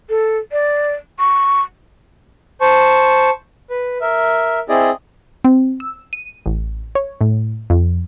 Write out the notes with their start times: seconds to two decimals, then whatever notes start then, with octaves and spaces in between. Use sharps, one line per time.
0.10 A4
0.52 D5
1.19 C#6
2.61 C5 A5 C#6
3.70 B4
4.01 A#4 E5
4.69 C4 E4 G#4 D5 D#5
5.44 C4
5.80 E6
6.13 D#7
6.46 A1
6.95 C#5
7.21 A2
7.70 F2